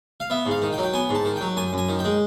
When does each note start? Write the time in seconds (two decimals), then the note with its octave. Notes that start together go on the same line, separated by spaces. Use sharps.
0.20 F5
0.30 B3 E5
0.46 G#2
0.51 F5
0.62 D#3
0.73 G5
0.78 F#3
0.83 G5
0.94 B3 G#5
1.09 G#2
1.15 A5
1.25 D#3
1.36 F#3 G5
1.57 F#2 G#5
1.73 F#2 G#5
1.89 D#3
1.99 G5
2.04 G#3